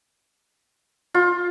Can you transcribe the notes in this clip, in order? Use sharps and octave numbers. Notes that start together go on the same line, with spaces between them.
F4